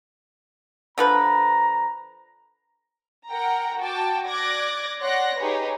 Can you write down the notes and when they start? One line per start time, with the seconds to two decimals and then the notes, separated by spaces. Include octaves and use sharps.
0.98 D3 F3 B4 A#5
3.28 A#4 F#5 G5 A#5
3.79 F#4 G5 A5 D6
4.27 D5 D6 F#6 G#6 A#6
5.01 C#5 D5 F#5 C6 F#6 A#6
5.37 D#4 G4 G#4 B4 C#5